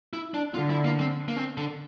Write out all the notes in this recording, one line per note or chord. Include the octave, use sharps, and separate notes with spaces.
E4
D4
D3 F4
E4
A#3
C4
A#3
C4
D3